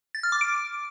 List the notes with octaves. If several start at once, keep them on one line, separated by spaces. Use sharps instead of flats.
A6
F6
D6
D7